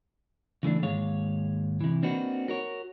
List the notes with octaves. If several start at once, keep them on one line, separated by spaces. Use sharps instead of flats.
C#3 E3 A3 D4
D#2 G#2 G#3 C#5 F5
C3 E3
A#3 C4 D4 D#4 F#4 B4
F#4 A#4 C#5